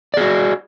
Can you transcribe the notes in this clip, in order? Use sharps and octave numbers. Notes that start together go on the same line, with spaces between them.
F#4 G#4 D5